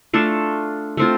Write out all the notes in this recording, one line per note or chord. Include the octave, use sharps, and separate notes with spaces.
A3 D4 F4 A4
A3 C4 F4